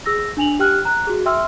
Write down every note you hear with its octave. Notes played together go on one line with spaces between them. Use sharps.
G#4 E6 A#6
D4 G#5 F7 F#7
G4 G5 F6 F#6
A#5 F#6
F#4 G#4
E5 G5 C6 E6 F6